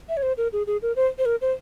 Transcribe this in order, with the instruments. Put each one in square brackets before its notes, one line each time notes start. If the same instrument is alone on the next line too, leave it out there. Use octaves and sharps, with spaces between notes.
[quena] E5
C#5
C5
A#4
G#4
G#4
A#4
C5
C5
A#4
C5